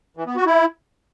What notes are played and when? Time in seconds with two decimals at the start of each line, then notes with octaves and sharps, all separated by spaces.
0.17 E3
0.26 B3
0.36 F#4
0.46 E4